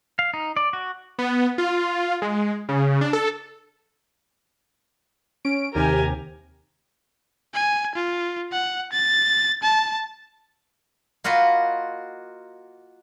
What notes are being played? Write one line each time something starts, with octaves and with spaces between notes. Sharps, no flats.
F5
D#4
D5
F#4
B3
F4
G#3
C#3
D4
A4
C#4 D7
D#2 C3 G4 A#4 G#5
G#5
F4
F#5
A6
A5
A#3 F4 F#4 D#5 B5